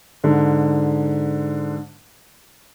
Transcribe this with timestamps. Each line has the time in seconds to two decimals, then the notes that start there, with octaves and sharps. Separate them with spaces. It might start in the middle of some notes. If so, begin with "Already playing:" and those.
0.24 G#2 D3